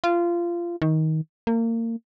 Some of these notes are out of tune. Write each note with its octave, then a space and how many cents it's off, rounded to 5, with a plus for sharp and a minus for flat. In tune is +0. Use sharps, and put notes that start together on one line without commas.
F4 -20
D#3 +20
A#3 -30